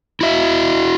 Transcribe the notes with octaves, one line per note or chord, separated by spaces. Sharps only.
E4 F#4 E5